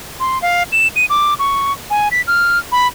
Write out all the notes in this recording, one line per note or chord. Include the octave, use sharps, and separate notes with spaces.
C6
F5
E7
D#7
D6
C#6
G#5
B6
F6
B5